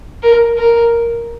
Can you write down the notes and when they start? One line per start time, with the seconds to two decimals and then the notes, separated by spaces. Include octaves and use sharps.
0.23 A#4
0.58 A#4